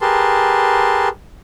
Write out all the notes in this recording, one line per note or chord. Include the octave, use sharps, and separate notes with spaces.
G4 G#4 A#4 B4 A5 C6